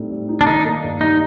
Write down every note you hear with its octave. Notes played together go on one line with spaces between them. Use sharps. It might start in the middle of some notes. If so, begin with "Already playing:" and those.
Already playing: A2 G3 C4 D#4
G3
D#4
D4
D#3 D#4
A#3
G2
G3 D#4